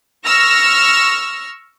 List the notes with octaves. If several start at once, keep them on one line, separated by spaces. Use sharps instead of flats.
C#6 E6 F6 A#6